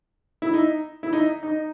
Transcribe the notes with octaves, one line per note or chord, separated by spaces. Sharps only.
E4
D#4
E4
D#4
D#4